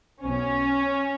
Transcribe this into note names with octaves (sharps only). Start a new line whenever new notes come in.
B1 B2 C#4